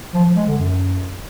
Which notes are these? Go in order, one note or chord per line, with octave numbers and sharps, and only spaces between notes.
F3
F3
G#3
D3
F#2